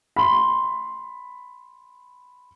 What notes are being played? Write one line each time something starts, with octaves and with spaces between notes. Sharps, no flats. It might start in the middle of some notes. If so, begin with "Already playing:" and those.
B5 C6